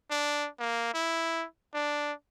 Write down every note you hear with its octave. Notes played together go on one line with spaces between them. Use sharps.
D4
A#3
E4
D4